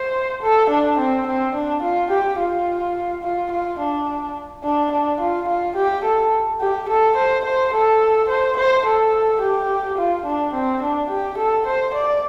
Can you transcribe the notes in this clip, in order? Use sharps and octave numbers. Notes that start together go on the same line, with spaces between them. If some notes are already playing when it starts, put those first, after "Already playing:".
Already playing: C5
A4
D4
C4
C4
D4
F4
G4
F4
F4
F4
D4
D4
D4
F4
F4
G4
A4
G4
A4
C5
C5
A4
C5
C5
A4
G4
F4
D4
C4
D4
G4
A4
C5
D5